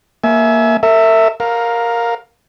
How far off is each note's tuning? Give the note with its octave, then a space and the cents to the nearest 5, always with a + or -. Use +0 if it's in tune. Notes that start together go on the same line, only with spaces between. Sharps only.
A#3 +0 E5 -10 G#5 +30
A#4 -45 E5 +0
A#4 +0 F5 +15